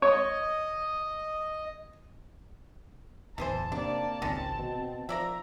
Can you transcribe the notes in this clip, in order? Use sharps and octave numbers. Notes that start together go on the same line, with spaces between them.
C#5 D#5
D1 E2 E3 G#4 C5 A5
C3 A#3 D4 D5
G#1 C#2 D#3 G#3 C4 C#4
B2
F3 A#4 D5 E5 A#5